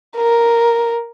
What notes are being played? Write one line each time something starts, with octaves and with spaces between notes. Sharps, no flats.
A#4